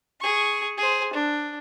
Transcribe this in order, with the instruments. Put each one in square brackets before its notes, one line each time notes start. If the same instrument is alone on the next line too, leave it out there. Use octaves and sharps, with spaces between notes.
[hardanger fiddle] G#4 C#6
G#4 C5
D4